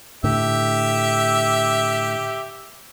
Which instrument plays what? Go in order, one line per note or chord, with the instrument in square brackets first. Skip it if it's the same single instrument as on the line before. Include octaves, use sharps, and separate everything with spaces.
[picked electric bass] A2 D3 [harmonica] G4 E5